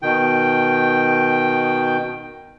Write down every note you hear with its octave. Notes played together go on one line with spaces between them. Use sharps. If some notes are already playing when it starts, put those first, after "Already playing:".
B2 D#3 G5